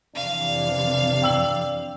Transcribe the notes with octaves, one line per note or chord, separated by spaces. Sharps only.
F2 C3 E3 D4 F5
G5 E6 F#7